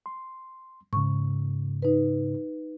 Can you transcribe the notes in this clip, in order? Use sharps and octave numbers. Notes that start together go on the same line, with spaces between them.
C6
G#2 C#3 C#6
D#4 B4